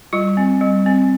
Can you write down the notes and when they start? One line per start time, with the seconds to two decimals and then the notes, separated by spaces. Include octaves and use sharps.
0.13 G3 F4
0.37 C4
0.61 G3
0.86 C4